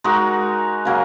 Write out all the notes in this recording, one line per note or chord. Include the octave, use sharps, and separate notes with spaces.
G#3 D#4 F#4 A#4
C#3 F#3 A#3